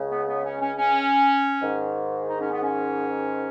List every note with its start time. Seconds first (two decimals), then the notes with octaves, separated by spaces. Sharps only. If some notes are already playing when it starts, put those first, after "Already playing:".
Already playing: C#2 C#3
0.10 B3
0.27 B3
0.43 C#4
0.60 C#4
0.77 C#4
1.61 G#2 D#3
2.28 D#4
2.40 C#4
2.51 B3
2.63 C#4